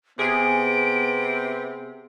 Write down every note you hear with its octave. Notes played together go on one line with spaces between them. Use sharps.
C3 B3 G#4 D7